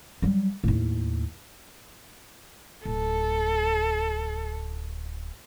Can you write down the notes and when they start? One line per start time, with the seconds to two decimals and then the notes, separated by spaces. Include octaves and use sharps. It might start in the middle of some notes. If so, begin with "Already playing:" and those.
0.22 F#3 G3
0.64 D#2 A2
2.85 D1 A4